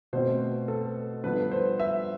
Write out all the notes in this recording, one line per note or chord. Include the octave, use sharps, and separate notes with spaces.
B2 A3 C4 C5
A4
G2 F3 B3 B4
C5
E5